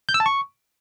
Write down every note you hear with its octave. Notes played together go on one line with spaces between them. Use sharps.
G6
E6
A5
C#6